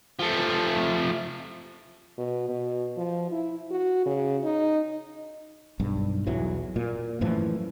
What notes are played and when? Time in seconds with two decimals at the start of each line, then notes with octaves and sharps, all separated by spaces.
0.20 F3 A3
2.18 B2
2.49 B2
2.97 F3
3.31 E4
3.71 F#4
4.06 C#3
4.43 D#4
5.80 B1 G2
6.27 B1 E2 E3 F#3
6.76 A#2
7.21 F#2 A2 E3 F3